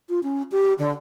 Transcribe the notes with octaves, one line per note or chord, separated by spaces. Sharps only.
F4
C#4
G4
D3